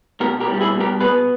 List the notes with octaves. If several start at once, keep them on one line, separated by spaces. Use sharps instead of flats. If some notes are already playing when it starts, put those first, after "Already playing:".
B2 G4 A#4
G4 A#4
G3
G4
E4 G#4
B2
G4 A#4
B3 G#4 B4